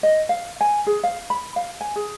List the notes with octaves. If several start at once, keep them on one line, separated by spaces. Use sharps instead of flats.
D#5
F5
G#5
G#4
F5
B5
F5
G#5
G#4